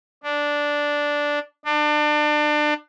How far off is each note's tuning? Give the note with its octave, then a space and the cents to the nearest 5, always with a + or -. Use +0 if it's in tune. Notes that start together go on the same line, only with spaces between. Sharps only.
D4 -5
D4 +30